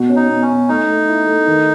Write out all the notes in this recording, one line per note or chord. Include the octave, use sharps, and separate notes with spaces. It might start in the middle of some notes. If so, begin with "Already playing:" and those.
Already playing: B2 F#4
C#4
D#4
B2
C#4
B2
A3 D#4
A3
E4
A3
D#3